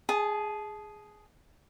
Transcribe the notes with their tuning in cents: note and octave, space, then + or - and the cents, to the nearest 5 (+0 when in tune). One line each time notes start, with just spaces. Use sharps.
G#4 +0 A5 -30